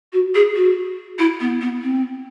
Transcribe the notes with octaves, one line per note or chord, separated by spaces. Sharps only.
F#4
G#4
F#4
E4
B3
B3
C4